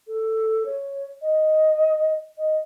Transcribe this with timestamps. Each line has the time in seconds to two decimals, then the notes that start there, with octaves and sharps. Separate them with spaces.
0.08 A4
0.66 C#5
1.22 D#5
2.38 D#5